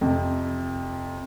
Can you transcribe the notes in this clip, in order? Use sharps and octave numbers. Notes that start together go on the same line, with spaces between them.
F2 C3